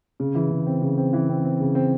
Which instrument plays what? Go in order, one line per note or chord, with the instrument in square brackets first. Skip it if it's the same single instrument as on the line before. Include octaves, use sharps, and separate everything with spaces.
[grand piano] C#3
E3
C#3
C4
C#3
C4
E3
C4
C4
C#3
C4